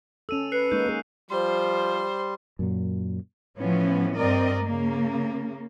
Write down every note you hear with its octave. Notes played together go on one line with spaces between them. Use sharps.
C#4 A4 E6 D#7 F7
B4 F#6 C7 C#7
G#3 A#3 D#4 C#6 G6
A#3 G#4
F3 G3 C5 C6
F#2 A#2 F#3
A2 E3 F3 B3 C#4
G2 C4 A#4 D5 D#5
C#3 A#3